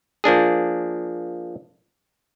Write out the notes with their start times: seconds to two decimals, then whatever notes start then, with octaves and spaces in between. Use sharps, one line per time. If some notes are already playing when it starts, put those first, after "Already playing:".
0.24 F3 A#3 D4 G#4